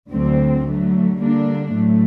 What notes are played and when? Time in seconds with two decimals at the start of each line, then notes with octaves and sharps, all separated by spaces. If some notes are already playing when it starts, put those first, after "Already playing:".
0.11 D2 D3 F#3 C4
0.65 D3 F#3 A3
1.18 D3 G3 A#3 D4
1.72 A2 F#3 A3